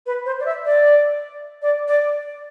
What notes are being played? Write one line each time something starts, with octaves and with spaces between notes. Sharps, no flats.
B4
C5
D5
E5
D5
D5
D5